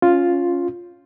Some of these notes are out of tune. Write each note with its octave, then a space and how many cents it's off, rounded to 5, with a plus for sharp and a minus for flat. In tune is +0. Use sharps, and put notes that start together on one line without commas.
C#4 +5 F4 +0